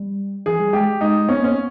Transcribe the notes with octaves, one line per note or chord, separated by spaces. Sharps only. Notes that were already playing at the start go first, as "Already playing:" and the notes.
Already playing: G3
E3 G#4
G3
G#3 G4
G#3 D#4
B3 C#4
A#3 C#4
B3